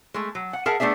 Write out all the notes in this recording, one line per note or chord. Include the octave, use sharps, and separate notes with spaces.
G#3 A3
F#3
F#5
G#4 A#4 E5 F#5 A5
A3 B3 D4 G#4 E5